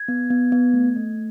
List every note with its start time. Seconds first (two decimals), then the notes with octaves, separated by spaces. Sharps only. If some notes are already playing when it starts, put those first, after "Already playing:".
Already playing: G#6
0.08 B3
0.30 B3
0.52 B3
0.74 A3
0.96 A3